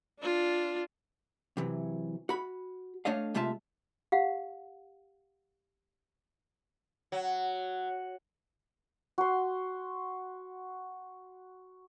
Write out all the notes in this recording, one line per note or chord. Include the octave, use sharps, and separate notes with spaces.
D4 F4
C3 E3 F#3
F#4 B5
A3 D4 C#5 D#5 F5
C3 G#3 A3 F4 E5 A5
G4 F5 F#5
F#3
F#4 C6